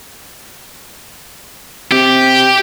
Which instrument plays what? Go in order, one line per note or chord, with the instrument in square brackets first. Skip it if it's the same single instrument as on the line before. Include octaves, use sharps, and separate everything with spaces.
[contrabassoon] C3 [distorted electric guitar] G4